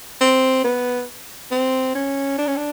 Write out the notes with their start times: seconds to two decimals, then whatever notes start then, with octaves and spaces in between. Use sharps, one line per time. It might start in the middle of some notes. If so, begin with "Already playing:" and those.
0.21 C4
0.64 B3
1.51 C4
1.95 C#4
2.38 D4
2.47 C#4
2.56 D4